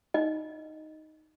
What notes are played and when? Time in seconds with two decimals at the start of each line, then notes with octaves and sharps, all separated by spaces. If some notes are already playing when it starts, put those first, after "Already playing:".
0.14 D#4 D#5